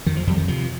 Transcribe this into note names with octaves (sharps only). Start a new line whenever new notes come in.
F2 D#3
F3
F2 G3
D#3
C3 F3